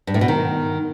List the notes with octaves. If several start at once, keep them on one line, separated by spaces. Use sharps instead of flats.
G2
A2
B2
D#3